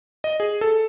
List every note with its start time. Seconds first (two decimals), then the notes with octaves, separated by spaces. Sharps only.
0.24 D#5
0.40 G#4
0.61 A4